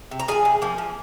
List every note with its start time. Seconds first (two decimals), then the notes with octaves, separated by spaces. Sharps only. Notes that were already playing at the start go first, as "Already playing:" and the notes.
0.11 C3
0.20 A#5
0.28 F3 A#3 G#4 G#5
0.45 C3
0.62 F3 A#3
0.78 F3